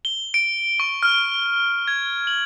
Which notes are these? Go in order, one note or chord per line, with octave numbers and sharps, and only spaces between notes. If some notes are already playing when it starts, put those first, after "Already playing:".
G7
D7
C#6
F6
G#6
F#7